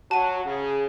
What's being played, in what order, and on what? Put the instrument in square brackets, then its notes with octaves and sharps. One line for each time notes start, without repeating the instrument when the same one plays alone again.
[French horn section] F#3 F#4 [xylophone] A5 D#7
[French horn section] C#3 G#4